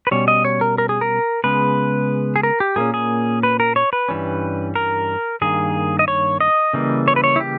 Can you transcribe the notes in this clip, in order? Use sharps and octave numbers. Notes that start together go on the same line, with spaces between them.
B4
B2 G3 C#4 C#5
D#5
C#5
A#4
A#4
G#4
A#4
C#3 G#3 B3 B4
G#4
A#4
G4
A#2 A#3 C#4 G#4
G#4
B4
A#4
C#5
B4
G2 E3 G3 C#4
A#4
G2 D#3 A#3 G#4
D#5
C#5
D#5
C#3 E3 G3 A#3
C#5
B4
C#5
E4
G4